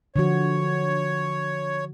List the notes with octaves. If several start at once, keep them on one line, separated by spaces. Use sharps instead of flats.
D3 F3 F#4 C#5